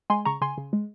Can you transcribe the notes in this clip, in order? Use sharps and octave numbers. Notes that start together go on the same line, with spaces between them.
G#3 G#5 C6
C#3 A#5 C#6
C#3 G#5 C6
C#3
G#3